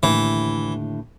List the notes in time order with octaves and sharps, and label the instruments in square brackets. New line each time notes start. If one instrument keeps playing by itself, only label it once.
[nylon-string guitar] D#2 A2 D3 [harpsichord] E3